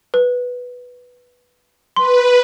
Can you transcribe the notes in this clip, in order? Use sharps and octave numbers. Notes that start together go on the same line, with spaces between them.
B4
B4 C6